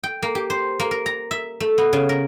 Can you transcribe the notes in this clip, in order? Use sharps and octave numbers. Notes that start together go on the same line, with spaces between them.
G5
A#3
G4
C5
A#3
A#4
A#5
E5
A3
B3
C#3
A#4